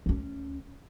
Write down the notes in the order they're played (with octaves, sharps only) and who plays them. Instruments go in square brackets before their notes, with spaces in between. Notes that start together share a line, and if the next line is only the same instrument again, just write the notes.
[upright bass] D2 C#4